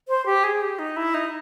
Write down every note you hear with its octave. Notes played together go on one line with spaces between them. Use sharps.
C5
G4
G#4
G4
D#4
E4
D#4